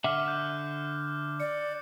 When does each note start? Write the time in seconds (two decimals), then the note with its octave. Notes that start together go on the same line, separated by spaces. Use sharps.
0.04 D3 E5 F#5 D6 F6
0.28 F#6 G6
1.40 D5 C#7